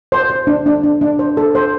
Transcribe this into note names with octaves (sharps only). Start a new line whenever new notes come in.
C5
C5
D4
D4
D4
D4
C5
A4
C5